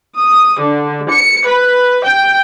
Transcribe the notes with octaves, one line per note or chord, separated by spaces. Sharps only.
D#6
D3
C#7
B4
G5